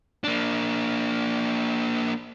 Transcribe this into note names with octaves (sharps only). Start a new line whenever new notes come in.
A#3 D4